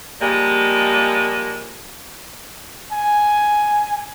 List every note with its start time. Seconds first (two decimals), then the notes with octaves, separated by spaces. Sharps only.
0.22 F3 G3 G#3 A#3
2.92 G#5